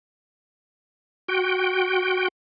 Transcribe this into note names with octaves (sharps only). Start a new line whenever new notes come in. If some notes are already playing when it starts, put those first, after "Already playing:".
F#4 G5